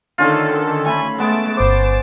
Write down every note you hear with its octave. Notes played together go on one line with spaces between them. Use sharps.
D3 D#3 C#4 F4 A4
A3 G#5 B5
G#3 A3 B3 A6 D7 E7
G1 C5 D6